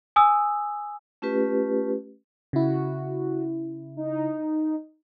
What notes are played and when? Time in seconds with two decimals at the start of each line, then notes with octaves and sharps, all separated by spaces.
0.16 G#5 D#6 E6
1.22 A3 C#4 F4 G4 B4
2.53 C#3 E4 F#4
3.97 D#4